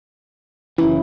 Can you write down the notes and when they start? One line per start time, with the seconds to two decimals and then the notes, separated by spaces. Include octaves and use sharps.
0.78 F#1 E3 C#4 E4